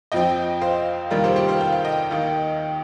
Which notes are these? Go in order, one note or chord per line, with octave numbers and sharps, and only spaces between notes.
F2 F3 C4 D#5 G5
C5 F5
F1 D#2 D#3 G3 F4 A#4
G4 C5
G4 C5
C5 F5
G5
F5
D#5 G5
D#2 D#3 A#3